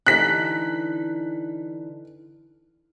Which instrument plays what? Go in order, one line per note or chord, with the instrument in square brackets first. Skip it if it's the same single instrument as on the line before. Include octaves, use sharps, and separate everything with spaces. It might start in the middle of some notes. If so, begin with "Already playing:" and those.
[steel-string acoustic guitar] D3 E3 D#4 [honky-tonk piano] F#6 B6